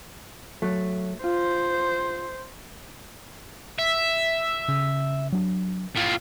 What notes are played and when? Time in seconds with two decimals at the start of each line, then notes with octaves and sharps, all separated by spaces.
0.62 F#3 A3
1.24 F4 C5
3.78 E5
4.69 C#3
5.32 F#3 D4
5.95 A2 F4